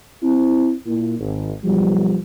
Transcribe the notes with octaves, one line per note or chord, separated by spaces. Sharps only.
C4 E4
A#2 E4
G#1
B1 F3 G3